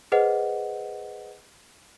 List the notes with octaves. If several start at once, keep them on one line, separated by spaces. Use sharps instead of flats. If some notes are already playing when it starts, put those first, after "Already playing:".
G#4 B4 C5 D#5 F#5